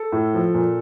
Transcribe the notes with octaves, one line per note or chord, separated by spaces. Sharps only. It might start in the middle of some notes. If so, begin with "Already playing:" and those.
Already playing: A4
A2
F3
A#2